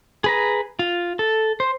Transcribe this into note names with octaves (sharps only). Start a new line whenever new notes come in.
G#4 B4 A#5
F4
A4
C5